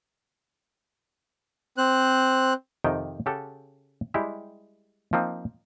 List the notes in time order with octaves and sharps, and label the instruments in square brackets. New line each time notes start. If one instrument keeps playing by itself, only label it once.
[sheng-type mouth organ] C4 C5 F#6
[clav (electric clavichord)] F2 C3 D#3 D#4 G5
C#3 G4 A4 F#5 A5
G3 G#3 E4 G4
F3 A#3 C4 D#4